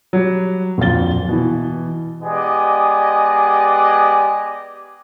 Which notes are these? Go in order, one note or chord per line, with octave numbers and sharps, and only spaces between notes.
F#3 G3
D1 F2 A#2 F4 A6 G7
B2 E3
G#3 B3 G4 D5 D#5 G#5